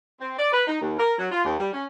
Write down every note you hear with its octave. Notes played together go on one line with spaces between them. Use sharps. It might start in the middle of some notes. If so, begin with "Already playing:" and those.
C4
D5
B4
D#4
D#2
A#4
F#3
F4
D#2
G3
C#4